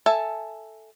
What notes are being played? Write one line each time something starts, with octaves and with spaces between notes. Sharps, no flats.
A4 E5 G#5 A5